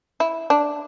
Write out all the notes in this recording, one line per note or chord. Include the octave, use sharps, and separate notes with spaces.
E4
D4